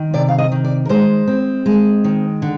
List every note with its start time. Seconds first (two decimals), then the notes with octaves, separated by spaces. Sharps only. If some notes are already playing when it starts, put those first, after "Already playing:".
Already playing: D#3
0.14 C3 D5
0.28 F5
0.38 D#5
0.52 D#3
0.64 D5
0.85 A#4
0.89 G#3 C5
1.27 C4
1.66 G#3
2.04 D#3
2.42 D3